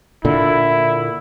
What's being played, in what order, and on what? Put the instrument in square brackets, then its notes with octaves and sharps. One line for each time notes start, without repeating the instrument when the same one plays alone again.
[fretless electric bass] A#2 D3 [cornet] E4